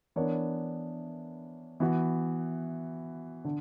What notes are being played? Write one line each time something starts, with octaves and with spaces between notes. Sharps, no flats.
E3 B3 D4 A#4 C#5
E3 B3 F#4
D3